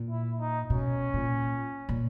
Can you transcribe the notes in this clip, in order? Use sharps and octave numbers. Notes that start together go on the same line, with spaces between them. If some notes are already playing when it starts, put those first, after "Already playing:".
Already playing: A#2
E4
D#4
B2 C#4
A#2
A#2